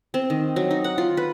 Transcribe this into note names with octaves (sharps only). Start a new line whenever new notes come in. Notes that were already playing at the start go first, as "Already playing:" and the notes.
C4
D#3
F#3
D#4
F#5
F4
B4